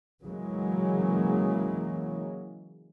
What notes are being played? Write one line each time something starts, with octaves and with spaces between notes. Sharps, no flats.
C#3 E3 F#3 G#3 A#3